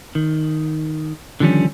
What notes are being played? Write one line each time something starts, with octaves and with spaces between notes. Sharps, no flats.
D#3
D3 D#3 F3 G3 C#4